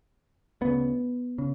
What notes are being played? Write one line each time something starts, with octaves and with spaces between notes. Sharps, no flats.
D2 C#3 B3
C#3